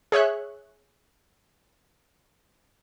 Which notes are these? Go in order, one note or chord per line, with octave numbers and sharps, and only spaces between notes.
G#4 C#5 E5 F#6